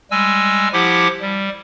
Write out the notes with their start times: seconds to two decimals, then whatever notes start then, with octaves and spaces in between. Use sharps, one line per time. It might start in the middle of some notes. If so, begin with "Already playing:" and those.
0.11 G3 G#3 G#5 E6
0.73 F3 E4 G4 F#5 D6
1.22 G3